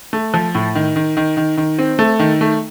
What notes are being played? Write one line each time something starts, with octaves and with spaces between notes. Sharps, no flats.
A3
F3
A2
D#3
D#3
D#3
D#3
D#3
C4
A3
D#3
A3